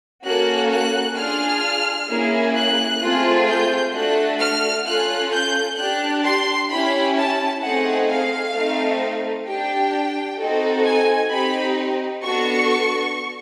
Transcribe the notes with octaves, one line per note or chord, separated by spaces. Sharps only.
A#3 C#4 F#4 A4 F#6
F#6
D4 F4 G#4 F6
A#3 C#4 E4 G#4
F#6
A3 C4 F4 G#4
G6
A3 D4 F#4 A4 F#6
F6
C#4 F4 A4 F#6
G6
D4 G4 F#6
C6
C#4 E4 G4 B5
A5
A3 C4 D#4 G#4 F#5
F5
A3 C4 D#4
D4 G4 G5
C4 D#4 F#4 A4
G#5
C4 D#4 G4 B5
B3 D4 F#4 A4 C#6